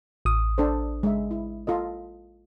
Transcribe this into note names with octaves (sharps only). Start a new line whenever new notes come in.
A1 D#6
D4 A4 C5
G#3 E5
E4
F4 A4 D#5